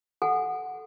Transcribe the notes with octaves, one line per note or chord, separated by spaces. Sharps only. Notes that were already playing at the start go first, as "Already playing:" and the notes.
A4 F#5 G#5